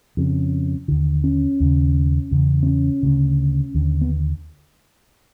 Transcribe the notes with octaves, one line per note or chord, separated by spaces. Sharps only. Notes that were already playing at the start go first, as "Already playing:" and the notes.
F2 C#3
D#2 D3
C#4
D#2 C#3
E2 C#3
C4
C#4
D2 C#3
D#2 D3
B3